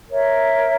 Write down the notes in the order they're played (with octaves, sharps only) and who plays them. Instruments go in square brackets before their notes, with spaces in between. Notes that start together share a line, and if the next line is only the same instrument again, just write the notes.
[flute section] A#4 C#5 E5